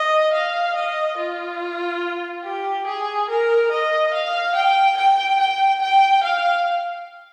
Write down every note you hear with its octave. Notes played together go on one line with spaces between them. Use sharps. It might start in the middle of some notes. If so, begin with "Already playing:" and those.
Already playing: D#5
F5
D#5
F4
G4
G#4
A#4
D#5
F5
G5
G5
G5
G5
F5